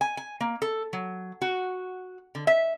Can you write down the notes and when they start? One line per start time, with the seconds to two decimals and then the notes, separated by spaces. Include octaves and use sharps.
0.01 G#5
0.17 G#5
0.41 A#3
0.62 A4
0.93 F#3
1.42 F#4
2.35 D3
2.47 E5